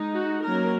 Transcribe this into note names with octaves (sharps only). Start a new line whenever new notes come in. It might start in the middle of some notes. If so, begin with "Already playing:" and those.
Already playing: G#3 D#4
F#4
F#3 A#3 C#4 A#4